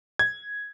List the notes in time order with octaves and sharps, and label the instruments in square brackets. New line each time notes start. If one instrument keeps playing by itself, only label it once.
[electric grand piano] G#6